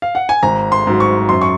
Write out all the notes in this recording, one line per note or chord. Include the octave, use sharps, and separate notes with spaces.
F5
F#5
G#5
G#1 A#5
C6
G#2 F#3
C#6
F#2 C6
C#6